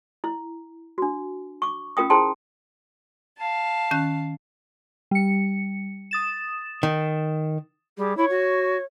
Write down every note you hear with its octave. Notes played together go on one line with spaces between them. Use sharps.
E4
D4 F#4
C#6 D6
C#4 F4 A#4 G5 D#6
E4 G#4 C5 G5 A5 C6
F5 A5
D#3 C#4 F#6
G3 C#7
D#6 A6 E7
D#3
G3 G#4
E4 C#5
F#4